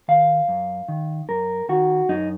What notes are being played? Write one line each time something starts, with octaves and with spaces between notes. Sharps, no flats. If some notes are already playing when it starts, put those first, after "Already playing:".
D#3 F5
F#2
D#3
F#2 A#4
D#3 F#4
F#2 D#4